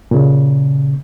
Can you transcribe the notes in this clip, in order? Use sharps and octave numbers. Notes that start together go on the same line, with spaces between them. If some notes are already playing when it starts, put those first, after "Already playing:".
A#2 C#3